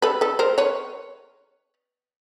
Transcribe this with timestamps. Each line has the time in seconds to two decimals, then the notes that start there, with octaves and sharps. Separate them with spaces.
0.02 A4 B4
0.21 A4 B4
0.39 A#4 C5
0.58 B4 C#5